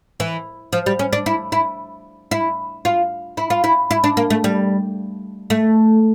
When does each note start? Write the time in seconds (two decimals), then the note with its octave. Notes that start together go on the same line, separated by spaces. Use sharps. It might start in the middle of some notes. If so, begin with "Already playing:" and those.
0.20 E3
0.73 F3
0.86 G3
0.99 C#4
1.13 D4
1.26 E4
1.52 E4
2.31 E4
2.85 F4
3.37 E4
3.50 F4
3.64 E4
3.91 E4
4.04 D4
4.17 A#3
4.30 A3
4.44 G3
5.50 A3